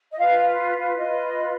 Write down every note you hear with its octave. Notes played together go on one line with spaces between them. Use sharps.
D#5
F4 B4 F5
F4 B4 D#5